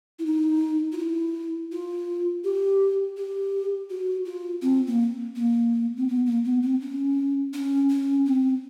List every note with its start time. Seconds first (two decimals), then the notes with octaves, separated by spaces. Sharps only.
0.19 E4
0.26 D#4
0.92 F4
0.98 E4
1.72 F4
2.44 G4
3.17 G4
3.90 F#4
4.26 F4
4.62 C4
4.87 A#3
5.36 A#3
5.97 C4
6.08 B3
6.26 A#3
6.44 B3
6.63 C4
6.81 C#4
7.54 C#4
7.90 C#4
8.26 C4